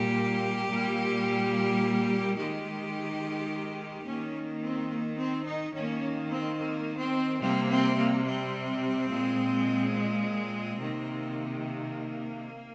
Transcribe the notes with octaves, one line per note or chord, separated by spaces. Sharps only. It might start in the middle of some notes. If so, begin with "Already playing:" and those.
Already playing: A#2 G3 A#3 G4
A#2 G3 A#3
D#3 G#3 G4
D#3 A#3 C#4
C4
A#3
C4
D#4
D#3 A#3 C#4
C4
A#3
C4
C3 G3 A#3 C4
C4
A#3
C4
A#2 G#3
C4
C3 D#3 A#3
A#3